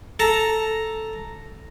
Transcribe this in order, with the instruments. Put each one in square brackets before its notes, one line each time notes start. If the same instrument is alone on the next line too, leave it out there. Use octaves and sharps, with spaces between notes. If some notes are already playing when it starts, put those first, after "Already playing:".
[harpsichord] A4 A5 A#5